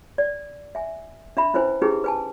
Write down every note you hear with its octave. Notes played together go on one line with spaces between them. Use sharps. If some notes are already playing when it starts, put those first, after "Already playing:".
D5
E5 G#5
D4 E5 B5
C#4 E4 B4 C5 G#5
C#4 D#4 E4 G4 G#4 B4
B4 G#5 A5